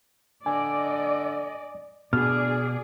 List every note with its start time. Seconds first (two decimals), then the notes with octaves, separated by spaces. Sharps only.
0.46 D3 D5 D#5 G#5
2.13 D2 B2 G#4 D5 F6